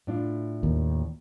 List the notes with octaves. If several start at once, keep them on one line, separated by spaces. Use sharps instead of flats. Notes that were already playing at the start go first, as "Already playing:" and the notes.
A2 D4 F4
D#2